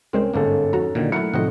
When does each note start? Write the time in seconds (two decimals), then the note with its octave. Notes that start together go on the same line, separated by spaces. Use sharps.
0.13 C2 G#3 C4 C#4 A#4 C5
0.34 G1 G#2 A#3 C#4 D#4 A4
0.73 F2 F#4 A#5
0.95 A#2 D3 D#3
1.12 F#3 A3 E4 A#4 F#5 C#7
1.34 A2 C3 D#3 F3 A3 C4 D#5 F#5